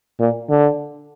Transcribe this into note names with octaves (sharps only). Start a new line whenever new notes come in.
A#2
D3